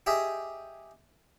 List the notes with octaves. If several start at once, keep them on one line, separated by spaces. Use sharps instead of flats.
G4 G#4 D#5 E5 G#5